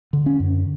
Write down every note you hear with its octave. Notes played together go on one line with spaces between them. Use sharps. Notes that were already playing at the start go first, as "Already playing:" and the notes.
D3
C#4
F#2